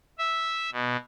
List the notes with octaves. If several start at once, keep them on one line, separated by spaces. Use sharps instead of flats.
E5
B2